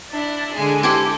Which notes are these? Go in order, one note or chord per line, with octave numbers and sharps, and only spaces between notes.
D4 E4
D3 G#3 G#4
E4 G4 A4 C5